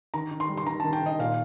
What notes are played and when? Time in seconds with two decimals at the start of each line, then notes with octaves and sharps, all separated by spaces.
0.14 D#3 A#5
0.31 D#3
0.40 C6
0.49 G3
0.57 C6
0.67 D#3 A#5
0.80 A5
0.84 D#3
0.93 G5
1.02 D#3 D#5
1.19 A#2 F5